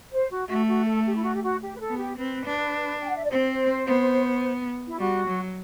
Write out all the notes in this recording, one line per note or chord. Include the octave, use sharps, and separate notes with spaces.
C5
F#4
A3 F#4
F#4
A4
G4
E4
F#4
G4
F#4
G4
B4
A4
B3
G4
C4 B4
D4
G5
F#5
E5
D5
C4 C5
B3
E4
G3 F#4
F#3